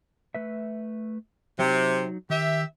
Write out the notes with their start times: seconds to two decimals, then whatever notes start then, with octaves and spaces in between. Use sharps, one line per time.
0.35 A3 B4 E5
1.59 C3 F#3 D#4
2.30 D#3 G4 E5